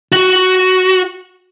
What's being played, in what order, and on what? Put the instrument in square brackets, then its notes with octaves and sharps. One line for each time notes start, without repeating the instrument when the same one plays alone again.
[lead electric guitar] F#4